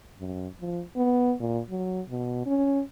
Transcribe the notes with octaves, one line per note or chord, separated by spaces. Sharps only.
F#2
F3
B3
A#2
F#3
B2
C#4